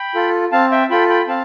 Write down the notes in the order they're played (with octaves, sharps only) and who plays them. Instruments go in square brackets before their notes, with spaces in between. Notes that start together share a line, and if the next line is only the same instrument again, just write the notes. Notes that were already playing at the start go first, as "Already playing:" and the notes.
Already playing: [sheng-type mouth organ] G5 B5
F4 A4
C4 F5 A5
E5 G5
F4 A4 G5 B5
G5 B5
C4 F5 A5